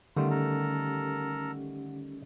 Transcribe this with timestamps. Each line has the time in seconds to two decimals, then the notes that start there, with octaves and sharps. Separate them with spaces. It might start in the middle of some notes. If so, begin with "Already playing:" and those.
0.17 D3 D#3 G3 A3 C#4 F4 G4
0.30 A4 A#4